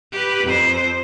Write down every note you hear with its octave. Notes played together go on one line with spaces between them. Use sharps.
G4 B4
F2 C5